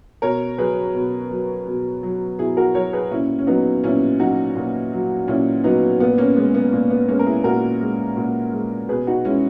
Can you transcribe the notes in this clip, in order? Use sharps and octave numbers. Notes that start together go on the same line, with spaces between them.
B2 A#4 C#5
F#3 G#4 B4
B2
F#3
B2
F#3
B2 E4 G#4
F#4 A#4
F#3 A#4 C#5
G#4 B4
A#2 C#4 E4
C#4
F#3 B3 D#4
A#2 C#4 E4
F#3 D#4 F#4
A#2
F#3
A#2 C#4 E4
F#3 B3 D#4
A#2 B3
A#3 C#4
G#3 B3
B3
A#2 A#3
B3
G#3 A#3 C#4
A#4
E4 G#4
A#2 F#4 A#4
G#3
A#2
G#3
B2 G#4 B4
D#4 F#4
G#3 C#4 E4